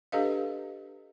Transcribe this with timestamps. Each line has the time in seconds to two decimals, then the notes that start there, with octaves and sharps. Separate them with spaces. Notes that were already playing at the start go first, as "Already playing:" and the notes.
0.12 D4 G4 A4 B4 D#5 F5